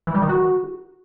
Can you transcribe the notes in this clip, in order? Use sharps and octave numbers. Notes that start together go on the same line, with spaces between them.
E3
G3
D#3
F#4